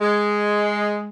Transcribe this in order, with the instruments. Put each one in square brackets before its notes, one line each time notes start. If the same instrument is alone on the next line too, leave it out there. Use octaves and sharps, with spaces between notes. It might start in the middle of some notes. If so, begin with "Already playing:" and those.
[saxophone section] G#3